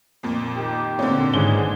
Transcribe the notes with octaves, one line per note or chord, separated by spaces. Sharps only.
F2 A#2
D#3 G4
A#2 D3 C4 C#5
G#1 G#2 G#3 B3 C#4 D4 G#4 G7